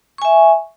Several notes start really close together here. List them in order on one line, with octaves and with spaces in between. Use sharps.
C#6 G#5 E5